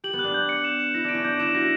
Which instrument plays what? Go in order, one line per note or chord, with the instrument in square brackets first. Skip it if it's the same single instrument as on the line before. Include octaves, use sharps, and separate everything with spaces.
[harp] G4 [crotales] F#7
[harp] B3
[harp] D4 [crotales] F#6
[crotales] G6
C#7
E7
E7
[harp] E4 [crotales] A#6
[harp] D4 [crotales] D7
[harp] C#4
[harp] D4 [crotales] G6
[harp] E4 [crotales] E7
[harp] F#4 [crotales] A#6